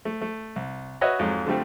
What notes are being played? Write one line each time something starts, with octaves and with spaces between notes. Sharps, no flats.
A3
A3
C2
F#4 B4 C#5 D#5 E5 F#5
F2 G#2 F#3
D3 F3 G3 A3 C4